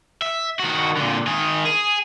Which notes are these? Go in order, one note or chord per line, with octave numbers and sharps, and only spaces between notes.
E5
D#3 F#4
A#2 D3
D#3 G#4
G#4